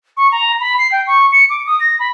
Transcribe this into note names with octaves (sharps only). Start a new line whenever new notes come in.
C#6
A#5
B5
C7
G5
C#6
C#7
D6
D#6
A#6
B5